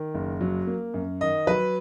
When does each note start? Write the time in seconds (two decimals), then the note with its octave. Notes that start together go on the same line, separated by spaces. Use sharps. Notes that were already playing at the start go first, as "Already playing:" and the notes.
Already playing: D#3
0.14 F#1
0.41 F#3
0.67 A#3
0.94 F#2
1.21 D#3 D#5
1.47 F#3 B4